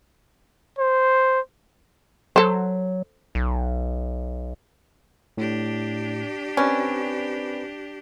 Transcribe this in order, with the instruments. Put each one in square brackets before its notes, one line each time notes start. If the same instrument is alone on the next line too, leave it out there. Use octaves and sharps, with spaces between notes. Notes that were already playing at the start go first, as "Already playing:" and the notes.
[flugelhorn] C5
[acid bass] F#3 [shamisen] A4 C5
[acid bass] B1
[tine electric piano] A2 [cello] D4 G4
[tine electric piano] C4 B4 D5 [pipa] C#4